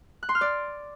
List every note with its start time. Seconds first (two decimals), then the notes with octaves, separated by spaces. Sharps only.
0.23 F#6
0.29 C6
0.35 F6
0.41 D5